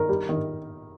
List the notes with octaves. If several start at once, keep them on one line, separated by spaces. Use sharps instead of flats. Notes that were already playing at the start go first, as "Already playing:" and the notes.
Already playing: D#3 A#4
G3
D#3